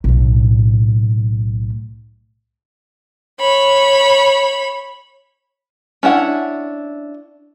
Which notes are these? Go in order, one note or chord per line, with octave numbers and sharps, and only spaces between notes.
B1 A2
C#5 B5
C#4 D4 E4 F#5